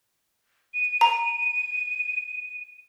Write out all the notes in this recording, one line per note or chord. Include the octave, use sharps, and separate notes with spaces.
D#7
A#5